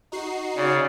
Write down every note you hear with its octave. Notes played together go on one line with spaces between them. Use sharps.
D#4 F#4 C7
C#3 D5